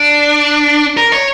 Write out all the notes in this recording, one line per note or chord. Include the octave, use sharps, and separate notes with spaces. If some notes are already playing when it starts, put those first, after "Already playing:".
Already playing: D4
A#4
C#5